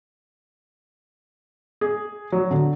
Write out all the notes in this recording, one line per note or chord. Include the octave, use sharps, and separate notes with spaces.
G#4
F#3
D3